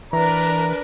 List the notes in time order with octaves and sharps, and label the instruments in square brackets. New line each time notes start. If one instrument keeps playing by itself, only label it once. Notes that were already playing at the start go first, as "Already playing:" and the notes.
[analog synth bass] E3 [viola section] D4 A#4 B4 [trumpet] A#5